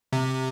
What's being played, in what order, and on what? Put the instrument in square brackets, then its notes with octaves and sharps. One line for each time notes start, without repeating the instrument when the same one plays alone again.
[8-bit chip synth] C3